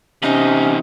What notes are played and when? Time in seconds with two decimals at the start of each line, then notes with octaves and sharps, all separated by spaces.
0.23 E2 C3 C#4 D#4